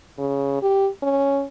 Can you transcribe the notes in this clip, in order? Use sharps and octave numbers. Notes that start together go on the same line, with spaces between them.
C#3
G4
C#4